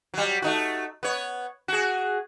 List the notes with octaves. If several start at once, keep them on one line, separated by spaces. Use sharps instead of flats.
F#3 G3
A3 D#4 F#4
B3 C#5
F#4 G#4